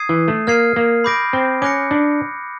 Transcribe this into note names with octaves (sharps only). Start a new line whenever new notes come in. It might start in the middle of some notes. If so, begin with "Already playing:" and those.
Already playing: D#6 G#6 C7 D#7
E3
A3
A#3 F6 G#6 C7 D#7
A#3
B5 D6 G6 A#6 D7
C4
C#4 D6 F#6 A#6 C#7
D4